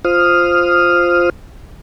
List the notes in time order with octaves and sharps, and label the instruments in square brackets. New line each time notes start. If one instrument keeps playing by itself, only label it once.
[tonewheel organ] F4 C5 D#6 F6